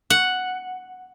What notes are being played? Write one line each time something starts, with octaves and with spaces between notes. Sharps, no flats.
F#5